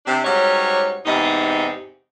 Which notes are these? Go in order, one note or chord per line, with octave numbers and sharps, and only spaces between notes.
C3 D4
G#2 F#3 G3 C#4 C#5
E2 G#2 C3 D#4